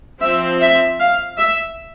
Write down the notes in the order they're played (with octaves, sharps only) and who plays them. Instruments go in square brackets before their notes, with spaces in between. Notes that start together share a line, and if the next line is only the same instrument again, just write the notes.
[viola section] F3 C4 E5
E5
F5
E5